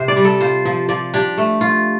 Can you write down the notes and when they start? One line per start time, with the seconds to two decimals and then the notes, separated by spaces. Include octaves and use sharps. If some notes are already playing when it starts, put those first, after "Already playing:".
Already playing: C3 C5
0.08 D5
0.16 G3
0.25 A4
0.40 F4 C5
0.65 F3
0.89 F3 D5
1.14 D4 G4
1.37 A3
1.61 F4